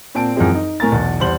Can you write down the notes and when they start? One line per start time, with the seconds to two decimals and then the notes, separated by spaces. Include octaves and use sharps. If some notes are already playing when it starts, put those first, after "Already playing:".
0.15 A#2 C4 A5 D7
0.36 F#2 E3 F3 G#3 C4
0.55 D#4
0.80 A2 A#4 G#5 A#5 A6
0.92 B1 E2
1.20 E2 G3 C5 F#7